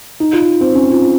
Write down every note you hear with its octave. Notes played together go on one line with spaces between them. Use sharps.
D#4
F4
C4
C#4
F4